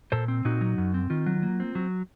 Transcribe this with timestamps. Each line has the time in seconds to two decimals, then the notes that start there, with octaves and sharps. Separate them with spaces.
0.12 A#2 A4 C5
0.28 C4
0.45 A#2 D#4 F#4
0.61 F#3
0.78 F#2
0.94 C4
1.10 D#3 F4
1.26 F#3
1.43 A#3
1.60 C4
1.75 F#3